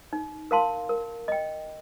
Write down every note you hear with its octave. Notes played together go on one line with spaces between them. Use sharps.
D#4
A#4 F5 A5 C6
A#4
D#5 G5